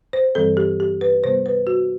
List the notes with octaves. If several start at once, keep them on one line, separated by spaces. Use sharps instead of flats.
C5
G2 E3 G3 C4 A4
G4
G4
B4
C3 G3 B3 C5
B4
F#4